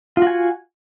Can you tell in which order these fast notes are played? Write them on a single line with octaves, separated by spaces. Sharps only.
F4 F#4 G#5